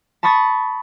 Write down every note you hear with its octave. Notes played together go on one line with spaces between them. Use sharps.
A5 B5 C#6 D#6 A6